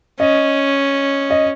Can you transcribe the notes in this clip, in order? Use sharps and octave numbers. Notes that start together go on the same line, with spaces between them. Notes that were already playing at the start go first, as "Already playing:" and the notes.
C#4 D#5
D#5